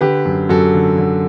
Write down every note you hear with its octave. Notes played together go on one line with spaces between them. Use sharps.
D3 G4 B4
F#2
F#2 F#4 A4
D3
D3